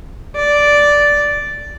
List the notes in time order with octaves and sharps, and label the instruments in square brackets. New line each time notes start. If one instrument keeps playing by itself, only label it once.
[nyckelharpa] D5